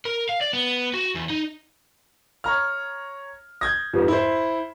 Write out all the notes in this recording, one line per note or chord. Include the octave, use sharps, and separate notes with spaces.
A#4
F5
D5
B3
F#4
E2
D#4
C#5 A#5 F6
D#6 G6 G#6 A#6
F2 G#2 F4 G4 B4
E4 C5 B5